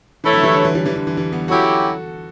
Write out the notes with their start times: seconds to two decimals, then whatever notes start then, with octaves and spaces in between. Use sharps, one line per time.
0.23 E3 A3 E4 A4 C#5 E5
0.33 D3 F#3
0.43 E3 G3
0.54 D3 F#3
0.65 E3
0.75 E3 G3
0.86 E3 G3
0.96 D3
1.07 E3
1.17 E3 G3
1.32 G3 B3
1.48 F#3 C#4 E4 F#4 G4 A4
1.64 F#4 A4